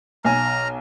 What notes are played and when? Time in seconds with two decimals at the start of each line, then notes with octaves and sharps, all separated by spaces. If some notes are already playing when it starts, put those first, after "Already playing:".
0.25 B1 G#5 A#5 F6